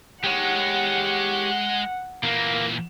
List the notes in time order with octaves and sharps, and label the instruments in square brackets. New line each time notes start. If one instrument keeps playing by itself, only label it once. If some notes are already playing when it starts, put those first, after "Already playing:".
[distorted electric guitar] G#3 [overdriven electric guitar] G4 C#5 [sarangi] F#5
[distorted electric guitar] A#2 E3 [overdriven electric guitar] A#3